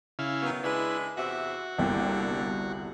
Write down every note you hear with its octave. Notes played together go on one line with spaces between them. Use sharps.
C#3 E4 F5
D#3 F#3 B3
G#3 D4 E4 B4
E2 C3 F#4 E5
G1 C2 D3 A#3 G5